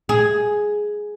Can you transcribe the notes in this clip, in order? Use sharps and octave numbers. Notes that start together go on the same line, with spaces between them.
G#4